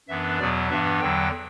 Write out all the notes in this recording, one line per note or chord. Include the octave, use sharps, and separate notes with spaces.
F#2 E3 B3 D4 E5
E2 B2 F#3 B3 D5
G2 E3 B3 D4 E5
E2 D3 F#3 G5